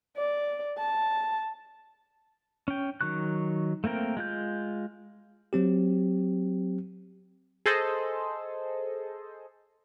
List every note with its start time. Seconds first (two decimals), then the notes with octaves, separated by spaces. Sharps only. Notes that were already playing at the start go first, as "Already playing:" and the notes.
0.17 D5
0.78 A5
2.68 C#4 G5
3.01 D#3 F#3 C#6 F#6
3.84 A3 A#3 C4 A#4 G5
4.17 G#3 F4 G6
5.53 F#3 C4 G4
7.66 G#4 A4 C5 D#5